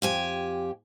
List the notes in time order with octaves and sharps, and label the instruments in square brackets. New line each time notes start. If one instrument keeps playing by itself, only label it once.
[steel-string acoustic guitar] F2 G4 G#5